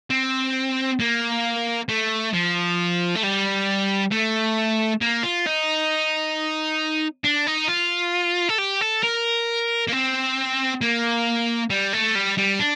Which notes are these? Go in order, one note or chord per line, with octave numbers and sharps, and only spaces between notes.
C4
A#3
A3
F3
A3
G3
A3
A#3
F4
D#4
D4
D#4
F4
A4
G4
A4
A#4
A#3
C4
A#3
G3
A3
G3
G3
D4